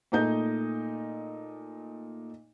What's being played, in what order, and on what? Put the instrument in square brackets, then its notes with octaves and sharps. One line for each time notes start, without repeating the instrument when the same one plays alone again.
[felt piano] A#2 A3 D#4 D#5 G6